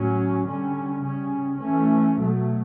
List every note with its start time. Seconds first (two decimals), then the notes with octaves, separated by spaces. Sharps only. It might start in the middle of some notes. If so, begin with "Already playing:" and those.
Already playing: A2 F#3 C#4
0.47 D3 G3 C#4
1.03 C#3 G3 C#4
1.60 E3 A3 C#4
2.16 B2 F#3 A3